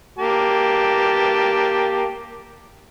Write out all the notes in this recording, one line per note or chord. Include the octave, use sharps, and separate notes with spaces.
A#3 G4 A5